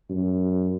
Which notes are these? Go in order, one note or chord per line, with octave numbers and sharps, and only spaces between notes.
F#2